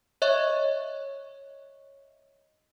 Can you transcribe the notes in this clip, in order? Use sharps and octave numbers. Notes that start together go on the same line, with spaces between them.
C#5 D#5 E5 C#6